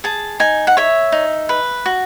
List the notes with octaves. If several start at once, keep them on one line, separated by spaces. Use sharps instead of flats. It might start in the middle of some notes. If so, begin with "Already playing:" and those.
G#4 A5
D#4 G#5
F#5
C#5 E5
D#4
B4
F#4